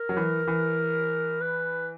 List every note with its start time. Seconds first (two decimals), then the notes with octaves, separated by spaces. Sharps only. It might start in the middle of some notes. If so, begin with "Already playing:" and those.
Already playing: A#4
0.09 F#3
0.17 E3
0.48 E3
1.41 B4